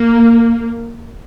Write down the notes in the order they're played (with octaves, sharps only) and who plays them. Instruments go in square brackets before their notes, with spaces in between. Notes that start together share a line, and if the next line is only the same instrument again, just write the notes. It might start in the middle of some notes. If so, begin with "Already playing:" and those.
Already playing: [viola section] A#3